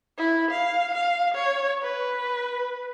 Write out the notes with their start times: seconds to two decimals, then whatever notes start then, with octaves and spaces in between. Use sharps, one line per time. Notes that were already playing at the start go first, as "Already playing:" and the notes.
0.18 E4
0.51 F5
0.94 F5
1.34 C#5
1.83 B4